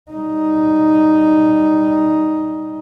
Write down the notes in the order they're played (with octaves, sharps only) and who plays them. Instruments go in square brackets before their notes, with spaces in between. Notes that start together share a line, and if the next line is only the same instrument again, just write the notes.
[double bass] G3 D#4